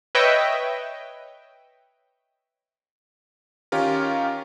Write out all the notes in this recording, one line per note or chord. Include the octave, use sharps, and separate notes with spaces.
B4 C#5 D#5 E5 G5
D#3 C#4 F4 G4 A#4